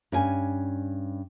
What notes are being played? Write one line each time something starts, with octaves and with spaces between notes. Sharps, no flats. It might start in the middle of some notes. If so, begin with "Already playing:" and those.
G2 C#4 G#5